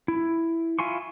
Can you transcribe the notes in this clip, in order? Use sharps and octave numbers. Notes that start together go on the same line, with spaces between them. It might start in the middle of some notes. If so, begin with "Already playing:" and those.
E4
E4 F4 G#5 C6 C#6